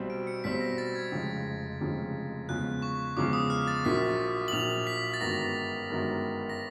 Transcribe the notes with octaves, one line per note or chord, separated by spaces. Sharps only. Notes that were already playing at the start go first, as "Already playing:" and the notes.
Already playing: B1 B2 G3 C4
D7
C#7
B1 B2 G3 C4 B6
A#6
A6
G#6
F1 F2 C#3 F3 G#3
F1 F2 C#3 F3 G#3
E2 C#3 F3 G#3 F#6
C#6
E2 C#3 F3 G#3 D6
D#6
F6
A6
A#1 A#2 F#3 A#3 B6
F#7
A#1 A#2 F#3 A#3 F7
B6
A6
G1 F#2 D#3 G#3 B3 A#6
G1 F#2 D#3 G#3 B3
A#6